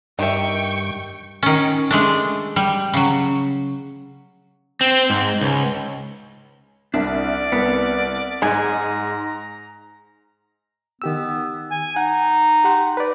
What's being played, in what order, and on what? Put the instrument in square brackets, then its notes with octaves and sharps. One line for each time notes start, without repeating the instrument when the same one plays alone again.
[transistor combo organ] G2 [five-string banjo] D#3 E5 [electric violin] G5 C#6
[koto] D#3 C#4
G#3 A3 D4
G3
C#3 F#3
[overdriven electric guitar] C4
G#2
C#2
[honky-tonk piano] C2 E5 [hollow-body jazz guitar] D4 [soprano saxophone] D5
[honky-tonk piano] C2 [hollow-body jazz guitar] B3
[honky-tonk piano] G#2 [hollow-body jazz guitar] D5 D#5 G#5 [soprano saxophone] A#5
[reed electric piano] D#3 G4 E6 [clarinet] B3
[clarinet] G#5
[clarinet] D#4 [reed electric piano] F#5
[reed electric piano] G4 F#5 C6
B4 D5